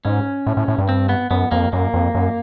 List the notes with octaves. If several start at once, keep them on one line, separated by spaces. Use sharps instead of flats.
G#2 C#4
A2
A2
A2
G2
C4
B3
F#2 B3
F2 A#3
F#2 A#3
F2
F#2